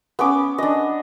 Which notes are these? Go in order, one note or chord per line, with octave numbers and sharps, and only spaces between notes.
B3 C#4 D6
D4 D#5